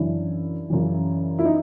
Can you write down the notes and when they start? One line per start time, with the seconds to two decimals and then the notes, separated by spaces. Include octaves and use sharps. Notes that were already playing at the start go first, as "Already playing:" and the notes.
Already playing: F#2 C#3 E3 D4 E4
0.70 F#2 C#3 E3
1.39 E4
1.45 D#4